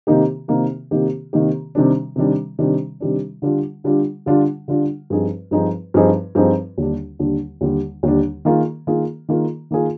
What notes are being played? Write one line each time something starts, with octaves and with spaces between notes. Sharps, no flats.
C3 D#3 A#3 D#4 G4
C3 D#3 A#3 D#4 G4
C3 D#3 A#3 D#4 G4
C3 D#3 A#3 D#4 G4
C3 D#3 G3 D4
C3 D#3 G3 D4
C3 D#3 G3 D4
C3 D#3 G3 D4
D3 G3 D4 F4
D3 G3 D4 F4
D3 G3 D4 F4
D3 G3 D4 F4
G2 F3 C4 D#4 G#4
G2 F3 C4 D#4 G#4
G2 F3 C4 D#4 G#4
G2 F3 C4 D#4 G#4
D#2 D3 G3 D4
D#2 D3 G3 D4
D#2 D3 G3 D4
D#2 D3 G3 D4
D#3 A#3 F4 G#4
D#3 A#3 F4 G#4
D#3 A#3 F4 G#4
D#3 A#3 F4 G#4